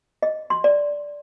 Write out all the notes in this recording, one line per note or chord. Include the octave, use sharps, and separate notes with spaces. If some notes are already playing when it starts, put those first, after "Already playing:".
D#5
C6
D5